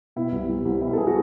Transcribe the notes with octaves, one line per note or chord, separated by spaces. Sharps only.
B2 E4
C2
C2
C2
B2 E4
A4
G#4
F#4